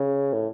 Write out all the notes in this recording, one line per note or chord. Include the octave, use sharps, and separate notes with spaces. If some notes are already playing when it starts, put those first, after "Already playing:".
Already playing: C#3
A2